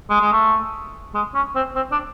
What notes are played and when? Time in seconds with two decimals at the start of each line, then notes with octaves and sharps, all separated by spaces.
0.10 G#3
0.21 G#3
0.32 A3
1.14 G#3
1.35 C#4
1.55 C4
1.76 C4
1.92 D4